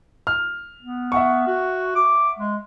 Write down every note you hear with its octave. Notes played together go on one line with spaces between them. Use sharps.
F6
B3
E5 F#5 C#6
F#4
D6
G#3